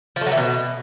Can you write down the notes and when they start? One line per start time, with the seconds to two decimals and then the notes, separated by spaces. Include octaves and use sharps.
0.16 F3
0.21 A3
0.27 F#3
0.32 E3
0.37 B2